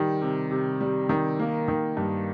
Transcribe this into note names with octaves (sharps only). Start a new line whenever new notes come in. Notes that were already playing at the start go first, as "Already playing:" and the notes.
Already playing: D#3 G3
C3
C3
G3
D#3
A#3
D#3
G2